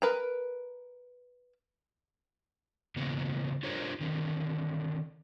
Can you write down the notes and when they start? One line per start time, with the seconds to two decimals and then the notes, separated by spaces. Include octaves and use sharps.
0.02 A#4 B4 A#5
2.96 A2 C#3 E3 F#3 A#3 B3
3.63 D4 F4 G4 A#4 C5 C#5
4.01 D3 D#3 C4